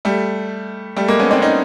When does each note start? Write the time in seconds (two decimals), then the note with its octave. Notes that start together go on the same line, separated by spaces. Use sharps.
0.05 G3 A3
0.97 G3 A3
1.08 G#3 A#3
1.20 B3 C#4
1.31 C4 D4
1.42 C#4 D#4